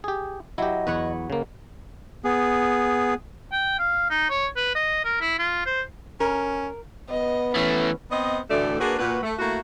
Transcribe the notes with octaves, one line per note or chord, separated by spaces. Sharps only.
G4 G#4
F#3 E4 G4 D#5
E2 B4 C#5 F#5
C#3 A#3
B3 G#4
G5
F5
D#4
C#5
B4
D#5
A#4
E4
F4
C5
C#4 A#4
B3 D#5
E3 A3 C#4
B3 C4 C5 D#5
D2 A2 D3 E3 A3 D5
A#3 D4 F#4 G#4 B4
A#2 F#4 B4
A3
A3 A#3 E4 F#4